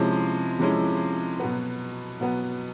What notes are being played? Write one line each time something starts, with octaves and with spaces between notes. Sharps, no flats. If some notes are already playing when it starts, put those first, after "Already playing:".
Already playing: C3 F3 G#3 C#4 E4
C3 F3 G#3 C#4 E4
B2 F#3 B3
B2 F#3 B3